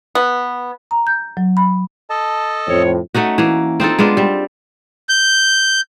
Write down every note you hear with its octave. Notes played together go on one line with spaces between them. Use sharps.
B3
A#5
G6
F#3
B5
A4 D#5 A5
F2 A2 C4 C#5
A3 C#4 D#4 F#4
E3 A#3
C4 D#4 F4 A4
G#3 B3 D4 F4
G3 C4
G6